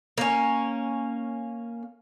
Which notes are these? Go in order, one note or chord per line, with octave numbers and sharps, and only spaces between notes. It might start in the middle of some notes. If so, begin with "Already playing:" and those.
A#3 C#4